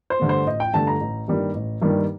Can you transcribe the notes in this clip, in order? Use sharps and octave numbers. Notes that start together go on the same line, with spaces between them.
C5
G2 D3 A3
C5
A1 D#5
G5
G2 D3 A3 A5
A#5
A1
G2 D#3 G3 A#3
A1
G2 D#3 G3 A#3